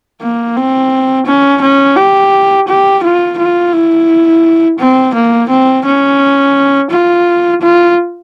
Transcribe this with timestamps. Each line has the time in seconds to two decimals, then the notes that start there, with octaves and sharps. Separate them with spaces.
0.21 A#3
0.56 C4
1.26 C#4
1.62 C#4
1.97 G4
2.68 G4
3.03 F4
3.38 F4
3.73 E4
4.80 C4
5.15 A#3
5.50 C4
5.85 C#4
6.91 F4
7.62 F4